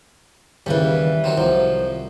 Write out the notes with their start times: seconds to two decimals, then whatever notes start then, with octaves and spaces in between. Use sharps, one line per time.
0.66 D#2 C#3 E3 G3
1.24 D#3 F#3 C4
1.37 C2 F3 F#3